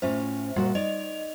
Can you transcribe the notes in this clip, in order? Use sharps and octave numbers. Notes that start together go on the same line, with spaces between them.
A2 C#4 F4 C5 E5
A#2 G3 F#4 F#5
D#4 D5 D#5 F7